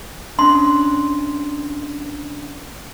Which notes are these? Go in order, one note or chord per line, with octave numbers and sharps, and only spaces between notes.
C#4 D4 C6